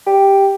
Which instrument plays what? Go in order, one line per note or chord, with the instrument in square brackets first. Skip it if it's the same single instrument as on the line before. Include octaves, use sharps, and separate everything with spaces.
[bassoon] G4